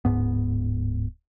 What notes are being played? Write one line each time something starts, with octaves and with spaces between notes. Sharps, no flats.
D1 G#2 B3